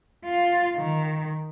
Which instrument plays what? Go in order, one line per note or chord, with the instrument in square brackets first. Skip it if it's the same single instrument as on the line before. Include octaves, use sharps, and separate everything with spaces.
[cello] F4
D#3